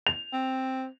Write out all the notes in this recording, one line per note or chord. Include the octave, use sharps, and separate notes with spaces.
F7
C4